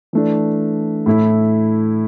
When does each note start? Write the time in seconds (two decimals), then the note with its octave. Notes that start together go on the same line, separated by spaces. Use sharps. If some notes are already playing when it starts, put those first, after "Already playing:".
0.13 E3 A3 D4
1.06 A2 A3 E4